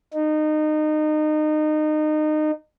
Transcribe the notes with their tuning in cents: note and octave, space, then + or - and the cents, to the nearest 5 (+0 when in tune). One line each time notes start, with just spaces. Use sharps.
D#4 -25